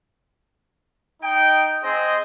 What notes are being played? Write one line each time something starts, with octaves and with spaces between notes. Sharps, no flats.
D#4 G5
C4 G#4 C5 D#5